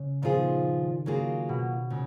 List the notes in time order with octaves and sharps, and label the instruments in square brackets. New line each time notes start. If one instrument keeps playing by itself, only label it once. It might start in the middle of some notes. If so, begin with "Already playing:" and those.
Already playing: [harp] C#3
[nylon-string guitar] A#2 F3 B3 F4 G#4 [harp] D#3
[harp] C#3 [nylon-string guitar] F#3 A#3 F4 G#4
[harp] B2
[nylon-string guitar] A#2 [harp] C#3